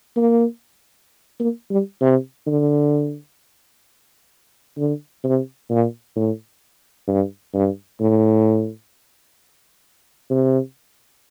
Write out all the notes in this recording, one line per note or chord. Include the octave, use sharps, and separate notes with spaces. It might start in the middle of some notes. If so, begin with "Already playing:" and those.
A#3
A#3
G3
C3
D3
D3
C3
A#2
A2
G2
G2
A2
C3